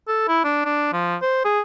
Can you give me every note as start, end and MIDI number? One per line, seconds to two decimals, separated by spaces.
0.08 0.24 69
0.28 0.41 64
0.44 0.65 62
0.65 0.90 62
0.93 1.16 53
1.22 1.44 72
1.45 1.60 68